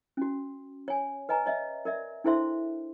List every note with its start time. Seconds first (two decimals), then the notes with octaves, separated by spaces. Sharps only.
0.17 C#4 F#4
0.88 C#5 G#5
1.29 B4 D#5 G#5 A#5
1.46 C#5 D#5 E5
1.85 A#4 D5 E5
2.24 D4 E4 A4 C5 E5 C6